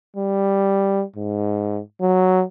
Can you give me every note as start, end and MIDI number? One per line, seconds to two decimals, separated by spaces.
0.17 1.04 55
1.16 1.81 44
2.02 2.44 54